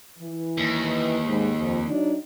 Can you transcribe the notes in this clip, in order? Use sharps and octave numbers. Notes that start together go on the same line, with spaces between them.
E3
D#2
G#2
F2
F#3 D4 D#4